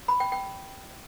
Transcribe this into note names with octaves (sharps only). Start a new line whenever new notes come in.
B5
G5
G5